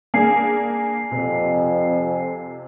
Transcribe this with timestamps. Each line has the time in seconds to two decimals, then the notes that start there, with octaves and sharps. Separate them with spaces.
0.14 A#3 D4 G#4 G#5 C7
1.11 F2 C3